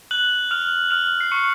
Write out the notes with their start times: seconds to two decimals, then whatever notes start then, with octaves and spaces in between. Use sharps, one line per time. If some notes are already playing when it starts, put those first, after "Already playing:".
0.11 F#6 F#7
0.51 F6 F7
0.91 F6 F7
1.21 C7
1.31 C#6 C#7